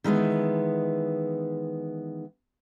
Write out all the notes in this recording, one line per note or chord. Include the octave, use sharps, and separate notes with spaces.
D#3 E3 G#3 B3